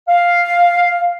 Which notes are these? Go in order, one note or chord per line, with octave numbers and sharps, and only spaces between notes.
F5